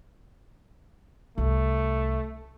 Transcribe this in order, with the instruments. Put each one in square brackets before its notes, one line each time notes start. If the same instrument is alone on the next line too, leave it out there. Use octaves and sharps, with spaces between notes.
[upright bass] C2 [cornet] A3